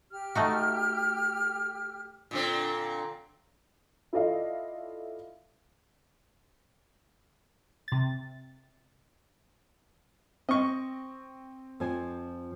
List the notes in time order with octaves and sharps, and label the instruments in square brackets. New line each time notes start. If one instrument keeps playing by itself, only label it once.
[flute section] G4 F6
[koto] A3 D#4 F#4
[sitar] A#2 D3 C4
[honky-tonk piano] E4 F4 A4 D5 D#5 F5
[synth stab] C3 A6
[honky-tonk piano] C4 [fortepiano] D#5 C#6
[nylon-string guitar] F2 F3 G#5